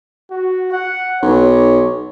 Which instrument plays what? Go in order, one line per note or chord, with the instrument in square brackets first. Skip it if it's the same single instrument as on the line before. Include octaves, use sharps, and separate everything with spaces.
[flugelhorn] F#4
F#5
[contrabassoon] B1 [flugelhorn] C#5